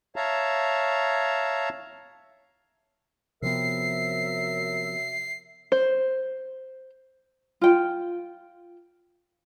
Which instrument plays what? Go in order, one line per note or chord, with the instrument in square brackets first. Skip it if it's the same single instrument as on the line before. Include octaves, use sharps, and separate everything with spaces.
[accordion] C#5 E5 F5 A5 A#5
[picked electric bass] C3 F3 B3 [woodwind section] F#3 A#4 E5 [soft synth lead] C7
[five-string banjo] C5
[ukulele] F4 G5